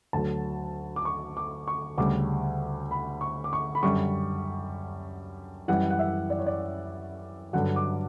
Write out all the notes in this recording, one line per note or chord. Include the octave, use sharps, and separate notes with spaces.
D2 D3 F#3 A5
D6
C#6
D6
C#6
D2 C#3 G3 D6
B5
C#6
D6
C#6
B5
F#2 D3 G3 C#6
F#2 E3 G3 F#5
F#5
E5
D5
C#5
D5
G2 D3 F#3 F#5
D6